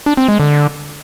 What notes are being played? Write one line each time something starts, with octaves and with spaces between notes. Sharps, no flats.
D4
C4
G#3
D3